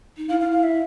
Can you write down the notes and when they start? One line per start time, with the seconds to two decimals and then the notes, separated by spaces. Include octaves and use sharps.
0.17 D#4
0.29 E4 F5
0.40 F5
0.52 F5
0.63 E5